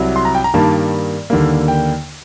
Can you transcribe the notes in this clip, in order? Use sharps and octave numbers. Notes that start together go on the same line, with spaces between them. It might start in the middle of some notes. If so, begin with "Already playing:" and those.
Already playing: C2 C3 F#3
C6
A#5
G5
A#5
G2 D#3 G3 A#3 A5
D#2 D3 G3 A#3
G5